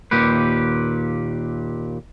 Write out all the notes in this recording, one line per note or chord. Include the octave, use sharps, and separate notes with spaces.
D#2 A#2 G4 B4